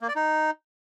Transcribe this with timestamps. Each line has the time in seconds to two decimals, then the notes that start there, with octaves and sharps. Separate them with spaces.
0.01 A#3
0.08 D5
0.16 D#4